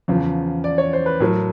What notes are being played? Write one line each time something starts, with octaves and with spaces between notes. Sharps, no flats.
E2 C#3 F3
D5
C#5
C5
B4
A2 F#3 A#4